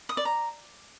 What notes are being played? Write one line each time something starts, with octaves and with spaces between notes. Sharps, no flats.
D#6
D5
A#5